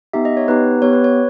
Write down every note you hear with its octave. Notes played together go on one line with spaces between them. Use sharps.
B3 D#4 G4 E5
D#5
C#5
B3 D#4 G4 B4
B3 G4 C#5
B4
C#5